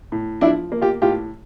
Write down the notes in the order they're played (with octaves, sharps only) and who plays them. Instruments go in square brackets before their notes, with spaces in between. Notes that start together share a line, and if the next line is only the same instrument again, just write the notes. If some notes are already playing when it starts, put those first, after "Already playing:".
[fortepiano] A2
F3 D4 E4
A#3
F4 G4
A2 F4 G4